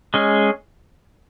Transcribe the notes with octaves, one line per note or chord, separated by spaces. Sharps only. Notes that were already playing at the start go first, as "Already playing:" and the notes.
G#3 C#4 G#4